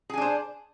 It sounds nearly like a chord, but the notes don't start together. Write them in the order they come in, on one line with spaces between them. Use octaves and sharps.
G#4 G#5 D4 C5